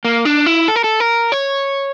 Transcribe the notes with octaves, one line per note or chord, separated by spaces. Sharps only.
A#3
D4
E4
A4
A#4
A4
A#4
C#5